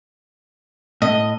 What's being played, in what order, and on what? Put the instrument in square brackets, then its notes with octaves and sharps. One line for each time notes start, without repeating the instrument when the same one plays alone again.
[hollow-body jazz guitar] A2 [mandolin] D#5